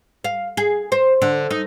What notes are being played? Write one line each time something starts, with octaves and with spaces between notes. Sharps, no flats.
F5
G#4
C5
D3
D#4